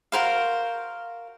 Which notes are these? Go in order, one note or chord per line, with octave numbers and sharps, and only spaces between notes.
F#4 A#4 C5 F5